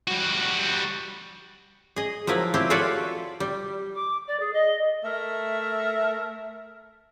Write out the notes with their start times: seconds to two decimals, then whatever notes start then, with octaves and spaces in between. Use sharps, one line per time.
0.08 G3 F#4
1.96 G#4 D#5
2.27 F3 F#3 E4 A#4 B4
2.54 C4 E4 G4
2.70 F4 F#4 A4 B4 C#5 D5
3.40 G3
3.95 D6
4.28 D5
4.40 G#4
4.53 D#5
5.04 A3 A#4 E5